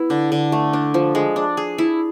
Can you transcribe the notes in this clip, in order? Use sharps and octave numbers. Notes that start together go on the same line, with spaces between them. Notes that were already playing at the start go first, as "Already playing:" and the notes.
Already playing: B3 E4
D3
D3
A3
D4
F3
G#3
D4
G#4
E4